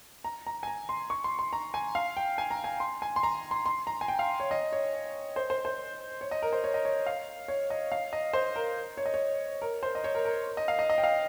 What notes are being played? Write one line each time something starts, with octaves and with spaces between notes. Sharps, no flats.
A#5
A#5
G#5
A#5
C6
C#6
C6
C6
A#5
G#5
F5
G5
G#5
A#5
G#5
C6
G#5
C6
A#5
C6
C6
A#5
G#5
G5
F5
C#5
D#5
C#5
C5
C5
C5
C#5
D#5
A#4
C5
C#5
D#5
C#5
F5
C#5
D#5
F5
D#5
C5
A#4
C#5
D#5
C#5
A#4
C5
D#5
C#5
A#4
A#4
D#5
F5
D#5
D#5
G5
F5